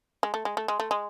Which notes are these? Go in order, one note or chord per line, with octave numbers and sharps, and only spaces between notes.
G#3
A3
G#3
A3
G#3
A3
G#3